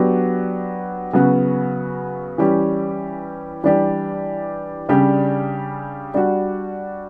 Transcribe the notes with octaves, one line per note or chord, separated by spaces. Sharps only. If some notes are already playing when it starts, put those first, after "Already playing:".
Already playing: F#3 B3 D4 G4
C#3 F#3 B3 F#4
E3 G3 C#4 G4
E3 G3 D4 G4
C#3 G3 D4 G4
G3 D4 F#4